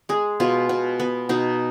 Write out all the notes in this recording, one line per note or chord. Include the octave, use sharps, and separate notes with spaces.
G#3 G#4
B2 F4
B2
B3
B2 D#4